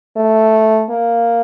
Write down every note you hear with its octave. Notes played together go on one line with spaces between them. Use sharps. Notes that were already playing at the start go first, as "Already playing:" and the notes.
A3
A#3